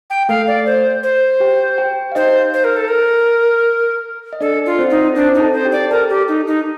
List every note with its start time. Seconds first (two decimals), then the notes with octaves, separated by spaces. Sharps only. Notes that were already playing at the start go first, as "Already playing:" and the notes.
0.10 G5
0.29 A3 A4 F5
0.47 D5
0.66 C5
1.03 C5
1.40 G4 G5
1.78 G4 G5
2.12 F5
2.15 D#4 C5 D#5
2.54 C5
2.64 A#4
2.77 A4
2.88 A#4
4.33 D#5
4.41 D4 A4 D5
4.66 F4
4.79 C4 C5
4.90 D#4
5.15 C4 D4 C5
5.35 D#4
5.40 A4 A5
5.54 C5
5.65 G4 G5
5.72 D5
5.90 A4 A#4 A5
6.10 G4
6.28 D#4
6.47 D#4